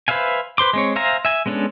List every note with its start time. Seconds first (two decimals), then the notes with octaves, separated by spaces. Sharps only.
0.08 B4 C5 E5 F5 G#5
0.58 B4 C5 C6 D6
0.73 G#3 C4 C#5
0.96 C5 E5 F5 G#5 A#5
1.25 E5 G#5
1.46 G#3 B3 C#4 D4 A4